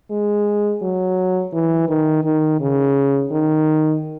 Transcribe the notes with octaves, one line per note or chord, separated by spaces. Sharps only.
G#3
F#3
E3
D#3
D#3
C#3
D#3